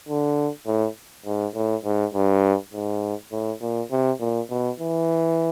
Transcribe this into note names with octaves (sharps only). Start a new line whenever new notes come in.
D3
A2
G#2
A2
G#2
G2
G#2
A2
A#2
C3
A#2
B2
E3